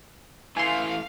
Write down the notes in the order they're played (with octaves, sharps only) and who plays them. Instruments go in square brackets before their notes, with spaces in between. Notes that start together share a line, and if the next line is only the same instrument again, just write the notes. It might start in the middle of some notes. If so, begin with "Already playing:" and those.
[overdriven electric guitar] E3 A3 [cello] F5 [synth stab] G#5 C6